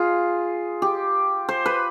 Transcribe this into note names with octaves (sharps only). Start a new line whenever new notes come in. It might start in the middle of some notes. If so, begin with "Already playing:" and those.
Already playing: F4 G#4
G4
C5
B4